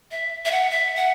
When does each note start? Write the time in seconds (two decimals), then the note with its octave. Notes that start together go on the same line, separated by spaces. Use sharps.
0.11 E5
0.45 E5
0.51 F#5
0.70 E5
0.96 F#5